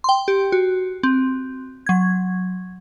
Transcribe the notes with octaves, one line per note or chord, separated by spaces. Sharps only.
G5 C6
G4
F#4
C4
F#3 G#6